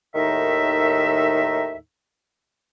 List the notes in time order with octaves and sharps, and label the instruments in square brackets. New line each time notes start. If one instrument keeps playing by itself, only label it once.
[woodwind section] D#2 A2 D#3 D#4 E5